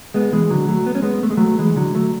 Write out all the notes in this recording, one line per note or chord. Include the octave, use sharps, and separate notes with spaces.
G#3 B3
E3 G#3
D3 F#3
F#3 A3
B3
C#4
G#3 B3
A3
G#3
F#3 A3
E3 G#3
D3 F#3
F#3 A3